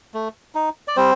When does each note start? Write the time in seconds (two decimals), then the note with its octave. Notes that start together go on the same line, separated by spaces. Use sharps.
0.14 A3
0.55 D#4
0.88 D5
0.96 G3 C4 C5